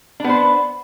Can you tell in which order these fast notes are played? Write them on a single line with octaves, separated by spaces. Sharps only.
D4 B3 C5